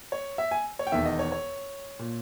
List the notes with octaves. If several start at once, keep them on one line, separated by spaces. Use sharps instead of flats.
C#5
E5
G#5
C#5
G5
E1 E2 D#3 E5
D#5
C#5
C#5
A#2